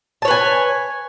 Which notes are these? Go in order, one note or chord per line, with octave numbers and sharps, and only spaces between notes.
B4 C#5 G#5 A5